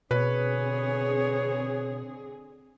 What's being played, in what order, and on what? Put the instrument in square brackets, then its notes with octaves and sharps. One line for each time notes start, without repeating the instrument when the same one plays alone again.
[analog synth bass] B2 [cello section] D3 C4 G#4 [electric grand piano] B4 [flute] C#5